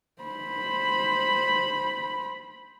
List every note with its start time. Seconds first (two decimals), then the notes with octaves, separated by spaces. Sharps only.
0.22 C5 B5